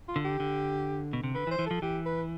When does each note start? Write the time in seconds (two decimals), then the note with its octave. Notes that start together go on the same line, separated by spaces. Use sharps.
0.08 F4
0.16 D3
0.24 G4
0.40 D3
1.13 B2
1.23 C3
1.35 D3 B4
1.47 E3
1.51 C5
1.59 E3
1.66 F3 A4
1.82 E3 G4
2.06 B4